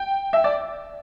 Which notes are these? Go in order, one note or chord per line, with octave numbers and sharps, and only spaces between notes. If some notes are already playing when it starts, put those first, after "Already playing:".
Already playing: G5
E5
D5